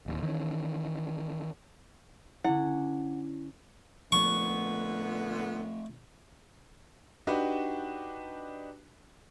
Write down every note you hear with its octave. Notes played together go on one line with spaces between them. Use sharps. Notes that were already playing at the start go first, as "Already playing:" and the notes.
D1 D#2
D#3 E3 C4 C#4
D3 C#4 E4 F#5
A#2 D3 F3 A3 B3 C#6
D4 D#4 F#4 G4 B4